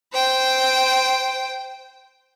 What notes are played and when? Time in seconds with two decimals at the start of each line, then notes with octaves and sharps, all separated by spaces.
0.13 C5 G5